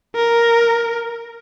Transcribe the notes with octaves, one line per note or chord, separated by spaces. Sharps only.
A#4